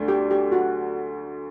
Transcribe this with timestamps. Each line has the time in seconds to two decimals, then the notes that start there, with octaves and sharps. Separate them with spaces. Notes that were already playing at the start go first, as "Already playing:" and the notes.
Already playing: D2 D3 A3 D4
0.08 G4
0.31 G4
0.52 F#4